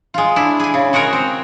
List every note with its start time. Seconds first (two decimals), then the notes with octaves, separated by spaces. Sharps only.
0.14 G#3 F4
0.36 D4 E4
0.60 G#4 G#5
0.74 C#3
0.93 G#3 F#4 G#4 A#4 C#5
1.13 C4